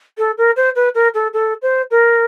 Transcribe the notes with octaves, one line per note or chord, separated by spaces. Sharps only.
A4
A#4
C5
B4
A#4
A4
A4
C5
A#4